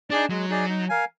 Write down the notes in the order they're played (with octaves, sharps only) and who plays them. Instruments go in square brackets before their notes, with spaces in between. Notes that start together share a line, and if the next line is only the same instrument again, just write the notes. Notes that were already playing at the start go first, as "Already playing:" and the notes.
[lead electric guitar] D4 [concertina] D#4 G#4 D5
[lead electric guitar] F#3 [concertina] G#3
[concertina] D#4 G#4 D5
D#4
A#4 F5 G#5